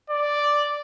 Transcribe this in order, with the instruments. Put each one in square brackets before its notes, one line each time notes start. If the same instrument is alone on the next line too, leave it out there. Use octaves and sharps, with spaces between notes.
[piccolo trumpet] D5